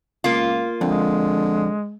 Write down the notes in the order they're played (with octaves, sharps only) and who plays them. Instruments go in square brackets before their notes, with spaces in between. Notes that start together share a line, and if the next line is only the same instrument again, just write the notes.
[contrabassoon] C#2 [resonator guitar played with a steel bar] A#3 F4
[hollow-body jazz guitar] F2 [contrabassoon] D3 [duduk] G#3